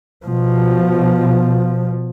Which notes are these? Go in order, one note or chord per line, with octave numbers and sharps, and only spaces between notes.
B2 F3